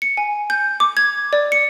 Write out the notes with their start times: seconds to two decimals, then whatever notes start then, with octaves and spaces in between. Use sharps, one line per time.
0.02 C#7
0.17 G#5
0.50 G6
0.80 D6
0.97 G#6
1.33 D5
1.52 C#7